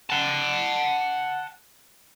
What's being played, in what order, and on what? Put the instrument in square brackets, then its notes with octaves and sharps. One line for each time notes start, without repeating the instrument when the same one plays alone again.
[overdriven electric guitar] F#5 A5